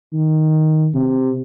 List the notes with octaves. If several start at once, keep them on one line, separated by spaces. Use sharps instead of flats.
D#3
C3